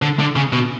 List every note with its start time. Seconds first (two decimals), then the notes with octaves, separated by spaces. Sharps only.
0.02 D3
0.19 D3
0.36 C#3
0.53 B2